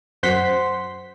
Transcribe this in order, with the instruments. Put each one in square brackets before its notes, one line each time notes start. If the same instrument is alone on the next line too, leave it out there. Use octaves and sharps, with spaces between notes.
[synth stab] F#2 C5 F#5 C6 B6